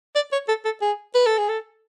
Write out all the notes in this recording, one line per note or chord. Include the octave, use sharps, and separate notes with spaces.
D5
C#5
A4
A4
G#4
B4
A4
G#4
A4